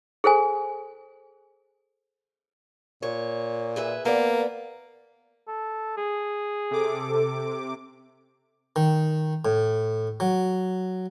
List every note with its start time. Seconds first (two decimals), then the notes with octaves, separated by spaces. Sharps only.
0.24 G#4 A4 C5 G#5
3.03 A#2 C#5
3.76 G#4 B4 E5
4.05 A#3 B3 D5
5.48 A4
5.97 G#4
6.71 C3 A4 D6
8.76 D#3
9.45 A2
10.20 F#3